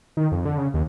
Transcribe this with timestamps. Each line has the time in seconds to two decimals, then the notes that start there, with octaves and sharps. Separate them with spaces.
0.17 D#3
0.32 F2
0.45 D3
0.58 C#3
0.74 D#2